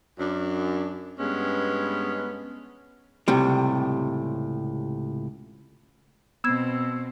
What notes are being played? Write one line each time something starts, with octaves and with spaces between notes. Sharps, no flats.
F#2 D4
G2 G#3 B3 C#4
C#2 A2 C3 G3
B2 B3 C4 E6 G#6